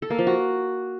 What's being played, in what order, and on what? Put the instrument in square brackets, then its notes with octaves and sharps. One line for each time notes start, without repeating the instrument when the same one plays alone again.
[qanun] A4
A#3
F3
F#4